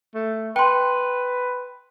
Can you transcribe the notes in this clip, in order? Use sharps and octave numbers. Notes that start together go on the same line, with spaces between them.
A3
B4 G5 C6